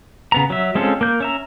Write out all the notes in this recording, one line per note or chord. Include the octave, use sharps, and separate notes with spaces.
C#3 B3 A#5
F#3 E5
G#3 C4 C#4 F4 A4
A#3 G6
C#4 E5 A#5